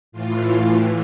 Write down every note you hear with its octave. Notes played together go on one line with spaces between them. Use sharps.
A2 E3 F4